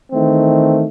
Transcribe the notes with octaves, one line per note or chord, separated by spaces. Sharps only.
D#3 E3 A3 C4